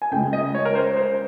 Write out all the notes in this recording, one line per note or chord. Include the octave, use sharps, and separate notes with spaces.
G#5
C#2 C#3 G#3 G5
D#5
C#5
A#4
C5
C5